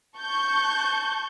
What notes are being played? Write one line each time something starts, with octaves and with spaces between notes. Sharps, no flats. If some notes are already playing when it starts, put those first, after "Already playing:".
A5 C#6 G6